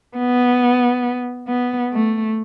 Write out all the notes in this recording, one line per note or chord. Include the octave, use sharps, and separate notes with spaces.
B3
B3
A3